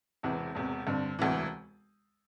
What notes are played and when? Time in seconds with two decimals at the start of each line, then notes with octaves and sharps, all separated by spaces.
0.23 E1 E2 C3 E3 C4
0.55 E1 E2 C3
0.87 G2 D3 C4
1.19 E1 D2 C3 E3